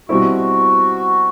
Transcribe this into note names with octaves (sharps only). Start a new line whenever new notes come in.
B2 G3 C4 E4 F#4